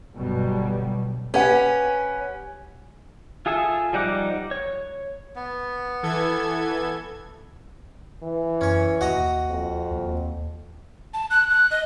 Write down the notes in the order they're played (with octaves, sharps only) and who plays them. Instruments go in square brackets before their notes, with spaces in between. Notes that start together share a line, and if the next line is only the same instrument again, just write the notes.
[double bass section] G1 B2 F#3 G3
[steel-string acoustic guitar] C#4 [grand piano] G4 B4 F#5
[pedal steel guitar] F4 G#4 A4 E5 G#5
F3 G3 D#4 F#5 D6
C#5
[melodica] B3
[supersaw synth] E3 A4 G#6
[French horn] E3
[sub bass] F#2 [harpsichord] C#4 C#5
[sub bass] D#2 [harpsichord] F#4 D#5 A#5
[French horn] F2
[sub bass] D#2
[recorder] A5
F#6
F#6
D#5